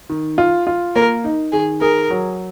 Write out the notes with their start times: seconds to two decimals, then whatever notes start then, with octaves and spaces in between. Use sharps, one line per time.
0.10 D#3
0.38 F4
0.67 F4
0.95 A#3 A#4
1.24 D#4
1.52 D#3 G#4
1.81 G#4 A#4
2.10 F#3